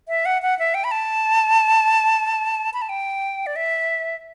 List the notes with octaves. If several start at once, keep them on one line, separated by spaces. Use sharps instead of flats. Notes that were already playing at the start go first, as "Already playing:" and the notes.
E5
F#5
F#5
E5
G5
B5
A5
B5
A5
G5
D5
E5